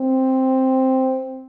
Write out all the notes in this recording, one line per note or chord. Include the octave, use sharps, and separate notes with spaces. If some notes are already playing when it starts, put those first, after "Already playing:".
Already playing: C4